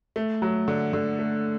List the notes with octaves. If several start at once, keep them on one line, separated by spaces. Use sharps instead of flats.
A3
F#3
D3
D3
A3